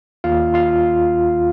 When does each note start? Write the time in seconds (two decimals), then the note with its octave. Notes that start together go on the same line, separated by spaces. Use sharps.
0.24 D#2 D#3 A#3 F4 F5
0.54 F4 F5